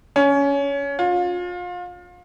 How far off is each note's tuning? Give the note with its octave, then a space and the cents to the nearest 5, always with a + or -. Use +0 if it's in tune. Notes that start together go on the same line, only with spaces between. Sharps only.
C#4 +20
F4 +30